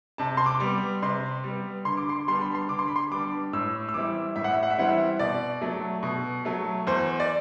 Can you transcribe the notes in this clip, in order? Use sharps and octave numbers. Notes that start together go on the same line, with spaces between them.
C3 A5
C6
D6
G3 B3
C3 C6
G3
B3
D3 C6
D6
C6
G3 B3 D4 C6
B5
C6
D3 D6
C6
B5
C6
G3 B3 D4 D6
A2 E6
E6
E3 G3 C4 E4 D6
A2 E5
F#5
E5
F#5
E5
E3 G3 C4 E4 F#5
E5
B2 D5
F#3 A3
B2
F#3 A3
E2 C5
D5